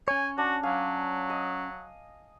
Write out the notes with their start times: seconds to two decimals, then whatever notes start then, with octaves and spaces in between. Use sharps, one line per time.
0.08 C#4 C#5 G#5
0.38 D4 F#4
0.63 F#3 F5 G#5
1.30 D#5